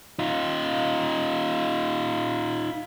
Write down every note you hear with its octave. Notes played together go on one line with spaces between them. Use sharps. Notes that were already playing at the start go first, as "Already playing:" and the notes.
D#4 F4